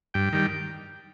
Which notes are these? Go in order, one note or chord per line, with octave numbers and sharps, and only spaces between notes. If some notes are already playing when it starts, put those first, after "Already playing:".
G2 G5
D#3 G3